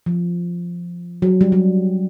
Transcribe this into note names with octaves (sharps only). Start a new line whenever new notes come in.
F3
F#3
G3
F#3